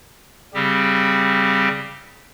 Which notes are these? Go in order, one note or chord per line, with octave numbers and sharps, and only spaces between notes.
C#3 G3 C4 G4